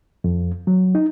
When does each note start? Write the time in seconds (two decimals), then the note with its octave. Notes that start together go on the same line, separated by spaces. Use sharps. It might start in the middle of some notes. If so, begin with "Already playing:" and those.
0.24 F2
0.67 F#3
0.95 D#4